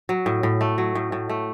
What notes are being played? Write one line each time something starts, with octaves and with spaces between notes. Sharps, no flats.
F#3
A2
A2
A3
F#3
A2
A2
A3